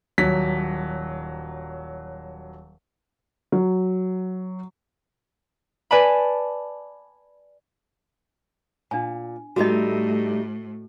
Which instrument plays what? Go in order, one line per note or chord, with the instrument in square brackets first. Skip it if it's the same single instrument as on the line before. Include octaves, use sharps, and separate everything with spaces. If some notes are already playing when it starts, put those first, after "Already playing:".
[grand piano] D#1 F#3 B6
[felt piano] F#3
[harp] B4 D5 G#5 A5 B5
[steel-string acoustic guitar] A#2 [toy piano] D4 G#5
[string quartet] A2 [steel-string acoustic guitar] G3 A3 D#4 [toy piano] F#4 D#5